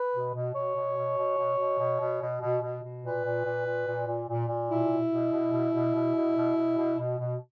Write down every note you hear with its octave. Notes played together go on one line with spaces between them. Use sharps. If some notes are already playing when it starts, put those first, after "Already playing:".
Already playing: B4
B2
B2
B2 C#5
B2
B2
B2
B2
B2
B2
B2
B2
B2
B2
B2
A#2 B4
A#2
A#2
A#2
A#2
A#2
A#2
A#2
B2 E4
B2
B2
B2
B2
B2
B2
B2
B2
B2
B2
B2
B2